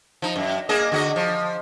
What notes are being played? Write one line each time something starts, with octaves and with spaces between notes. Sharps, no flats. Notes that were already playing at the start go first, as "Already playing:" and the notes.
F3 D#4
F#2
A#3 G#4 D#5
D3 F#4 D#5
F3